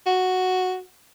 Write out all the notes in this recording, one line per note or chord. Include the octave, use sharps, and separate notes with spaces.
F#4